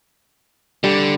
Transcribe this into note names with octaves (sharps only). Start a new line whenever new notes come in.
D3 G3